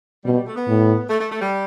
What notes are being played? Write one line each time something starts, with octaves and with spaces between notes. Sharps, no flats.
B2 G3
G3
A3
B3
A2
A3
A3
A3
G3